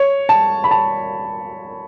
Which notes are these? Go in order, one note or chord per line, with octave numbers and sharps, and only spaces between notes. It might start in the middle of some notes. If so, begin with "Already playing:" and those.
Already playing: C#5
A5
B5
A5